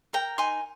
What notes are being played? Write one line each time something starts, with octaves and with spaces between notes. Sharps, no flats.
A#4 G5 A#5
D#4 G#5 C6